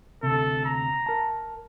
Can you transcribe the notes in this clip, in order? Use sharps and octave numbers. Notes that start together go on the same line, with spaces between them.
D2 C3 A4
A#5
A#4 A5